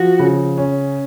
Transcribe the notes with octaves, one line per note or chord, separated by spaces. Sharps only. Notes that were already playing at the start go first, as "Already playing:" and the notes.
Already playing: F3 F#4
C#3
C#4